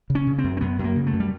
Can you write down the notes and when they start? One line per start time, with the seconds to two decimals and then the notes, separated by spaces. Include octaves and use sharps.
0.10 C#3
0.15 C#4
0.27 C#3
0.39 C4
0.44 F#2
0.57 C4
0.61 F#2 B3
0.79 F#2
0.84 A#3
0.96 C#3
1.07 A3
1.13 F#2
1.20 G3